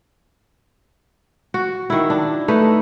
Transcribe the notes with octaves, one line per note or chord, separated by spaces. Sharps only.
F#4
D#3 E4
D4
A3 D#4 B4